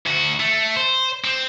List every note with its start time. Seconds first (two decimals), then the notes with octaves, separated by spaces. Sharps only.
0.06 D2 F#4
0.40 A3
0.76 C5
1.24 C4